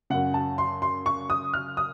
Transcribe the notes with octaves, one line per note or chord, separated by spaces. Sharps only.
F#2 C#3 F#5
A5
C6
C6
C#6
D#6
F6
D#6